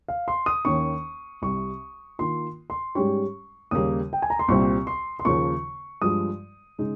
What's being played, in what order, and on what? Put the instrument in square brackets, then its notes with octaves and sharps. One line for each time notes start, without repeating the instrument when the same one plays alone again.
[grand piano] F5
C6
D#6
[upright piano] D#2 D#3 A#3 C#4 [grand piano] C#6
[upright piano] C2 C3 G3 [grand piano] C#6
[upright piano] D#3 A#3 F4 [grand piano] C6
[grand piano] C6
[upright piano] G#2 G3 C#4 G4 [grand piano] C#6
[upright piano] D#2 C#3 G3 A#3 [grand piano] D#6
[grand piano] G5
G#5
A#5
C6
[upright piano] C2 A#2 G3 C4 [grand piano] C#6
[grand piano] C6
C6
[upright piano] D#2 C#3 F3 A#3 [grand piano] C#6
[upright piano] G2 F3 G#3 [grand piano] D#6
[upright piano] C#3 G#3 D#4